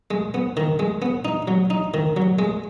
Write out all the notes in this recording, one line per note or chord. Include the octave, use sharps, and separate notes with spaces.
G#3
B3
D#3
G#3
B3
D#4
F#3
D#4
D#3
F#3
G#3